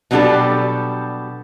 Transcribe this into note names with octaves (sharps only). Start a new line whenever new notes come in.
B2 F#3 G3 D4 G4 A4